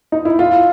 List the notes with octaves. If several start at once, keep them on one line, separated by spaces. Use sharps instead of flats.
D#4
E4
F4